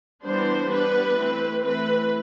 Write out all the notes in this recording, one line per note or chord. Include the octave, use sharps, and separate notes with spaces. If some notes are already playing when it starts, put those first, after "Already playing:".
E3 G3 B3 D4 C5
G3 B3 D4 B4
E3 A3 C4
E3 A3 C4 B4